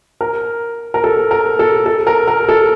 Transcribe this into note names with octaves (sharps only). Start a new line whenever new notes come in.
A#4
A#4
A4
A#4
A4
A4
A#4
A#4
A4